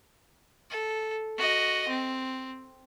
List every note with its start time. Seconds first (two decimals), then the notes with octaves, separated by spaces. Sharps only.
0.71 A4
1.37 F#4 D#5
1.88 C4